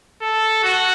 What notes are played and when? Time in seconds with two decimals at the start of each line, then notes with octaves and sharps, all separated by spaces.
0.22 A4
0.63 F#4